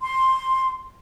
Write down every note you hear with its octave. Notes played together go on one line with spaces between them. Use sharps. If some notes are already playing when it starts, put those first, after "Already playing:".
C6